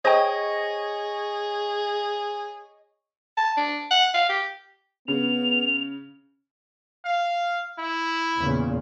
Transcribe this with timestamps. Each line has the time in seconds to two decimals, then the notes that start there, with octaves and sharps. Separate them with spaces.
0.05 G#4 C5 C#5 D#5 G5
3.37 A5
3.57 D4
3.91 F#5
4.14 F5
4.29 G4
5.08 C#3 B3 F7
7.05 F5
7.79 E4
8.38 E2 A#2 C#3